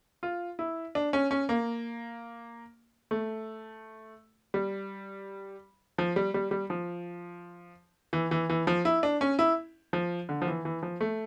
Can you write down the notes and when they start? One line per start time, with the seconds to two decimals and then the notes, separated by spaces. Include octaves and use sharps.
0.23 F4
0.59 E4
0.95 D4
1.13 C#4
1.31 C#4
1.49 A#3
3.11 A3
4.54 G3
5.98 F3
6.16 G3
6.34 G3
6.51 G3
6.70 F3
8.13 E3
8.31 E3
8.50 E3
8.67 F3
8.85 E4
9.03 D4
9.21 C#4
9.39 E4
9.93 F3
10.29 D3
10.42 F3
10.47 E3
10.65 E3
10.83 F3
11.01 A3